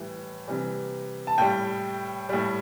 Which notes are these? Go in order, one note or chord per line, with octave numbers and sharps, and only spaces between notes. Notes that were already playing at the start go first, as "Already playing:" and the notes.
Already playing: A2 E3 G3
C3 E3 G3
A5
A2 G3 G5
A2 G3